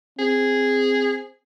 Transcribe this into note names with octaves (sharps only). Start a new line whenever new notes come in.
C4 G#4